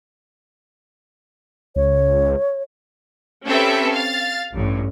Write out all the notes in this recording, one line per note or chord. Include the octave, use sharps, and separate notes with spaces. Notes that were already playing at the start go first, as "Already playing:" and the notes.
C#2 C#5
C4 C#4 G4 A4 B4 E5
F5 A6
A1 G2